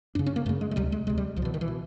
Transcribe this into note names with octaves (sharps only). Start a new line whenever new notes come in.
F#2 C#3 D4
C#4
A#3
F#2 C#3 A3
G#3
G#3
D2 C3 G3
G#3
D2 C3 G#3
G3
C2 F3
B2 E3
D#3
E3
B2